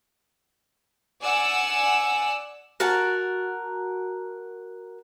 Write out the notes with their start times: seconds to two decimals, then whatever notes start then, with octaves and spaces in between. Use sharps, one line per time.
1.22 D5 F#5 G#5 E6
2.80 F#4 A#4 A5